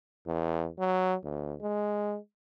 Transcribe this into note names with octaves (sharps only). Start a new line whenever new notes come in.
E2
F#3
D2
G#3